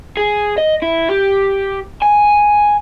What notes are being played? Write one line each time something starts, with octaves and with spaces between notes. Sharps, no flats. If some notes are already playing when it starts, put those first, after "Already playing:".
G#4
D#5
E4
G4
G#5